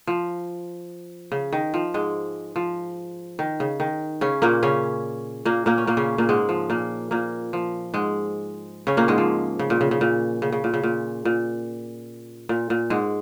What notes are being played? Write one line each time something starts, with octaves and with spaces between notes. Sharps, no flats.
F3
C#3
D#3
F3
G#2 G#3
F3
D#3
C#3
D#3
C#3 C#4
A#2 A#3
C#3 C#4
A#2 A#3
A#2 A#3
C#4
A#2 A#3
C#3 C#4
A#2 A#3
G#2 G#3
F3
A#2 A#3
A#2 A#3
F3
G#2 G#3
C#3 C#4
A#2 A#3
G#2 G#3
F3
C#3
A#2
C#3
C#3
A#2
C#3
C#3
A#2
C#3
A#2
A#2
A#2
A#2
G#2 G#3